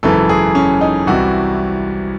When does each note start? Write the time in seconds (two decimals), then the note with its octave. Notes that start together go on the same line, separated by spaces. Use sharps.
0.03 G#1 F#2 C#3 E3 A4
0.29 G#4
0.55 C#4
0.81 D#4
1.07 C2 C3 E3 F#4